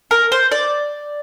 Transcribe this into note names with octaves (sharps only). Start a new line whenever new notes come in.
A#4
C5
D5